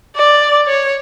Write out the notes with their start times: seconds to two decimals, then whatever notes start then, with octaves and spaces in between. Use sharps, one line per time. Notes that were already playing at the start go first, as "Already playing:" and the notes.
0.16 D5
0.67 C#5